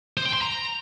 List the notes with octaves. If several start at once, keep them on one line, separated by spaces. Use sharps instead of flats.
C5
G5
C6
A#5